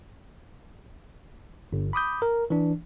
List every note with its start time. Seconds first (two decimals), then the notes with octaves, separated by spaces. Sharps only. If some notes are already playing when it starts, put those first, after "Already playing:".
1.73 G1
1.93 B5 D6 D#6 G6
2.22 A#4
2.50 E3 D4